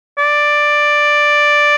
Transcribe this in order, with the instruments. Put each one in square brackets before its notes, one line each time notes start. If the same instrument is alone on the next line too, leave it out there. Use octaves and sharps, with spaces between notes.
[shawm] D5